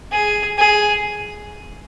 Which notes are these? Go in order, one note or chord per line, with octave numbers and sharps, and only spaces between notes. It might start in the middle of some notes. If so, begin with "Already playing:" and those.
G#4
G#4